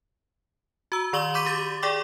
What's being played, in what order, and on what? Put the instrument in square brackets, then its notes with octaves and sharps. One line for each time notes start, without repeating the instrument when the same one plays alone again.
[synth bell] F#4 A#5 E6
D#3 D5 C6 C#6 F#7 G7
B5 C#6 D6 G6 B6 D#7
G4 A6
G#4 D5 G5 C#6 D6